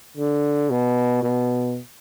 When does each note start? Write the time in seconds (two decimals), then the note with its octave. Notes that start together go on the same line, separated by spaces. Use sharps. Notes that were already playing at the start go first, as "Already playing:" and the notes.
0.17 D3
0.70 B2
1.23 B2